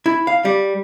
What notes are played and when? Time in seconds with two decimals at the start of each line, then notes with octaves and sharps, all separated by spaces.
0.06 E4
0.27 F5
0.45 G3